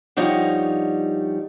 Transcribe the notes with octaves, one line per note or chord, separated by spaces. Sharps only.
G2 F3 G3 D#4 C#5 F#5